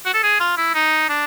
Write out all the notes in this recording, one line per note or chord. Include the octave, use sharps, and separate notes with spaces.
F#4
A4
G#4
F4
E4
D#4
D4